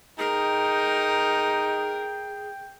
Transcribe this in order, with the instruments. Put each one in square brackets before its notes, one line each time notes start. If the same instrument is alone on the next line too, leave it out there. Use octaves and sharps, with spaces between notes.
[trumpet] D#4 [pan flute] G#4 [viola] A#4 [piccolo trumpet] G5